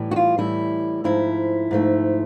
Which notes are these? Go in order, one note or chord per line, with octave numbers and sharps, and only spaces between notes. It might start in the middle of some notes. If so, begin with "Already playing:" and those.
Already playing: A2 E3 G3
F#4
F4
A2 E3 G3 E4
G#2 F3 A3 E4
G#2 F3 A3